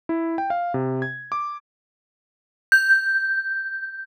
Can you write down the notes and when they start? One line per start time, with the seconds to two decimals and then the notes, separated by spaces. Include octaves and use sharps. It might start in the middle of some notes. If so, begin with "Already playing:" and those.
0.09 E4
0.38 G5
0.50 F5
0.74 C3
1.02 G#6
1.32 D6
2.72 G6